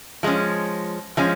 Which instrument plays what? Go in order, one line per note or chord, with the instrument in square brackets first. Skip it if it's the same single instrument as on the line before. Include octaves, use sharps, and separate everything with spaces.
[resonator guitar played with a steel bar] F3 G#3 C#4
F3 G#3 C#4